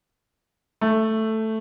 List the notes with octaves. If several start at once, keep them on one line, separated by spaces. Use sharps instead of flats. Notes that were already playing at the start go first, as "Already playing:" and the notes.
A3